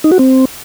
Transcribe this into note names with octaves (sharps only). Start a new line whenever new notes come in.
D#4
F#4
C4